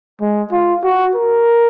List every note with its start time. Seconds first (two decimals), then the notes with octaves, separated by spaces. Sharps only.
0.21 G#3
0.52 F4
0.84 F#4
1.15 A#4